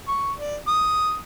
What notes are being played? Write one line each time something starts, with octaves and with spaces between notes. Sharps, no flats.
C#6
D5
D#6